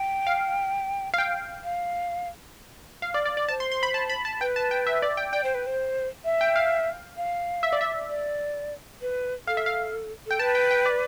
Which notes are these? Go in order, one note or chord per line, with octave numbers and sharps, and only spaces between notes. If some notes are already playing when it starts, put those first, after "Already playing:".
Already playing: G5
F5
F5
G5
F5
F5
D5
D5
D5
C5 A5
C6
C6
B5
A5
B5
A5
B4 G5
A5
G5
E5
D5
G5
D5 G5
C5
B4
C5
E5
G5
F5
F5
E5
D5
E5
D5
B4
A4 F5
E5
F5
A4 G5
B4 A5
G5
G5
D5